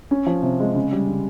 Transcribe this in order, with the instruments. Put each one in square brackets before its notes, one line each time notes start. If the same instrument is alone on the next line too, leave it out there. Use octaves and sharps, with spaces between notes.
[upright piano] C#4
F3
C3
G#3
C#3
G3
C#3